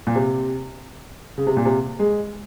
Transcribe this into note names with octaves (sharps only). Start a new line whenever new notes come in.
A#2
C3
C#3
C3
A#2
C3
G#3